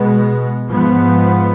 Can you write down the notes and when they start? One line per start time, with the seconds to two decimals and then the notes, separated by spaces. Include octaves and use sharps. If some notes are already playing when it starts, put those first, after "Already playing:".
Already playing: B2 G#3 B3
0.68 G#2 F3 B3